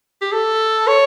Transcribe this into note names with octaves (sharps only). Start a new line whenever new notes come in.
G4
A4
C#5